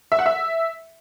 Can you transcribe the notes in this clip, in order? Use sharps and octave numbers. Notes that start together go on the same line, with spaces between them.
E5
F#5
E5